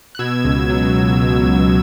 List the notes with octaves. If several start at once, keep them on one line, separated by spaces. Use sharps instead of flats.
F#6
B2 E6 G#6
C#2
F#3
C#2
B2
C#2